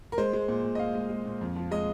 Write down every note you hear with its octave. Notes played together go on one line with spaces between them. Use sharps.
A#4
G#3 C5
G#3
A#2
A#2
D#5
A#2 F5
G#3
G#3
A#2
F2
F3
G#3 D#5